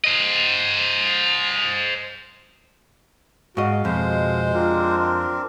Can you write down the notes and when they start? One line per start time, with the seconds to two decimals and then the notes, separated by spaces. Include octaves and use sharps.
0.04 C5 D#5
3.57 G#2 F#4 D#5 F5
3.85 F2 B2 G#3 C5
4.53 C4 D4 F4 A#4